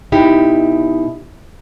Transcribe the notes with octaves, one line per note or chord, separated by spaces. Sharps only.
B2 D#4 E4 G4